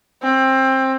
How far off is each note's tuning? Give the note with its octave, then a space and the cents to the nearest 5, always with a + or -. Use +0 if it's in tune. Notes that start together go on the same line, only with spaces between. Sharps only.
C4 +20